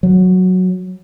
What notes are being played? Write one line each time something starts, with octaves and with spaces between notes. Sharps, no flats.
F#3